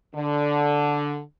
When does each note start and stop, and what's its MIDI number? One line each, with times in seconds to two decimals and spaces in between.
0.15 1.19 50